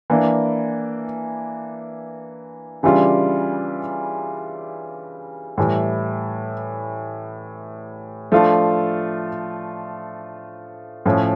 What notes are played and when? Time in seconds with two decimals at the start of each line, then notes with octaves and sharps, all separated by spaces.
0.10 E3 A#3 D4
2.83 C#3 E3 G3 D4 F4
5.58 A2 E3 G3
8.32 F3 A3 D4 F4
11.06 A2 F3 C#4